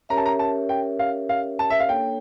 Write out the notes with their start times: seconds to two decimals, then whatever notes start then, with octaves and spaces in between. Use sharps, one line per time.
0.09 C#4 G4 A#4 C#5 E5 A#5
0.18 A5
0.26 A#5
0.39 A5
0.69 G5
0.99 F5
1.29 F5
1.59 A5
1.70 E5
1.80 F5
1.89 A#3 D4 A4 C#5 G5